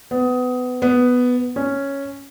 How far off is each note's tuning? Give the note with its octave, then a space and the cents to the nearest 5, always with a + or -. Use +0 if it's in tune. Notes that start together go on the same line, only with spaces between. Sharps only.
B3 +25
B3 +5
C#4 +0